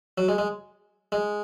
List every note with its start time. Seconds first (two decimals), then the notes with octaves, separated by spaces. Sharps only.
0.18 F#3
0.28 G#3
0.38 G#3
1.12 G#3